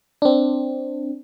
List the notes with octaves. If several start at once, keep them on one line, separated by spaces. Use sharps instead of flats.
C4 D4